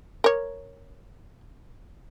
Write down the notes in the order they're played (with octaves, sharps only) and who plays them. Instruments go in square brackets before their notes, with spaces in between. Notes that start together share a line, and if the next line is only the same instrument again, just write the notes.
[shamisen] A#4 C#5